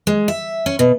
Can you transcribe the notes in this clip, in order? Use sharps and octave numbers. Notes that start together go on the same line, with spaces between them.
G#3
E5
C#4
B2